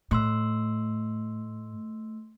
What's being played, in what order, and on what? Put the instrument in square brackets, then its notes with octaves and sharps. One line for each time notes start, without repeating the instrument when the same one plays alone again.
[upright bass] A2 [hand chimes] A3 C6 E6